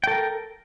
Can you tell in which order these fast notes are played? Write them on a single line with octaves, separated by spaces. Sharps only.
G5 A4 A#4